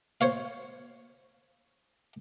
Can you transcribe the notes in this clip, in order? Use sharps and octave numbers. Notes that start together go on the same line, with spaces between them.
C5 C#5 F5